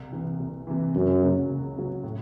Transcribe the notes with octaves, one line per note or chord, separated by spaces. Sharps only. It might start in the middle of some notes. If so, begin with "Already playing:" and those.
Already playing: C2
C3 E3
C2
C3 E3
C#2 F#2
C#3 F#3
C#2
C#3 F#3
A2